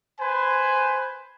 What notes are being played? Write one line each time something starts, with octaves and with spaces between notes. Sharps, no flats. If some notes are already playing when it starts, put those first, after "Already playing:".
B4 C5 G#5